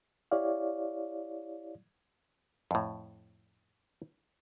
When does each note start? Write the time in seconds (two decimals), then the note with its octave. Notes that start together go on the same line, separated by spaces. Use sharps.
0.31 E4 G4 C#5 D5 F5
2.71 F2 A2